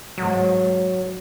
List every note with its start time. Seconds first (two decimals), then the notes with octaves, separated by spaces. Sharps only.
0.18 G#2 F#3